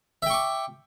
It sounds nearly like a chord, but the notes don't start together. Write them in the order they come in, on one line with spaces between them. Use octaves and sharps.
E5 G5 C#6 D6